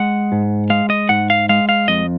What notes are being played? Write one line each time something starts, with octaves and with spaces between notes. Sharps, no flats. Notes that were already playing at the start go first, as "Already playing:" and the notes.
Already playing: G#3 F#5
G#2
G#3 F5
D#5
G#2 F#5
F5
G#3 F5
F5
F2 D#5